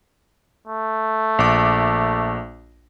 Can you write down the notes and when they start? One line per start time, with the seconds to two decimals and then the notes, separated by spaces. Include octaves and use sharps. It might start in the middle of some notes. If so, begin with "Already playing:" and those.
0.67 A3
1.39 A#1 D6